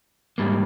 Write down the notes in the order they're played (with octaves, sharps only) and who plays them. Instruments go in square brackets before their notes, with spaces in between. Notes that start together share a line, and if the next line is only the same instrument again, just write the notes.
[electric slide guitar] G#2 G3 A#3